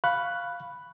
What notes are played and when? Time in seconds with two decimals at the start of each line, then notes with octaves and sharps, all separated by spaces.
0.04 F5 B5 C#6 F#6